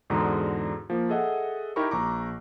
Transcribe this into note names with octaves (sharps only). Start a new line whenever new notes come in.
E2 G#2 D3 F#4 A#5 D#6
F3 A#3
G#4 A4 D#5 E5 F#5
D#4 E4 G4 A#4 B5 C#6
A#1 A#5 C#6 D6